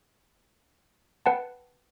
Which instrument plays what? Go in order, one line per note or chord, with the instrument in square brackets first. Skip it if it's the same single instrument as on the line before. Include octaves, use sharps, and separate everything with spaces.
[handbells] B4 F#5 G5 A5